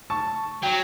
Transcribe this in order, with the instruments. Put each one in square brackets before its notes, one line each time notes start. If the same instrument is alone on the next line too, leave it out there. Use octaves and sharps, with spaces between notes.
[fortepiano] A5 C#6
[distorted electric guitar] F#3 [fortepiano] G5